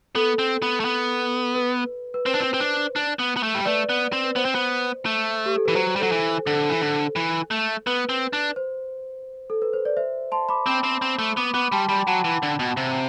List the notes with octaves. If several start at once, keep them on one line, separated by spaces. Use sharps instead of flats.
B3 A4
C4
B3
A3
B3
B4
B4
C4 C5
D4
C4
C4
D4
D4
B3
B3
A3
G3
A3 B4 D5
B3
C4
B4
B3 C5
C4
B3
A3
G4
A4
E3 B4
F#3 C5
G3
A4
F#3
E3
D3 A4
E3
D3
E3
A3
B3 B4
C4
D4
C5
A4
B4
C5
D5
C5 E5
A5 C6
B5 D6
C4 B5 D6
C4
C4
A3
B3 B5 D6
B3 B5 D6
G3 A5 C6
G3 G5 B5
F#3 F#5 A5
E3
D3
B2
C3